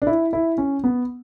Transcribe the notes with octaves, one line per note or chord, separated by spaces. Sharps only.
D4
E4
E4
C#4
B3